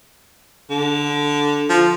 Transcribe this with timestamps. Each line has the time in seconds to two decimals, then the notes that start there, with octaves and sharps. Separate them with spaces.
0.70 D3
1.70 F3